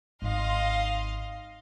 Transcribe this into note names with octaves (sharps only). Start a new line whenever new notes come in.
G#1 D#5 F5 C6